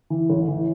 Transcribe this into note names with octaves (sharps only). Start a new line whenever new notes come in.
E3
A1
E3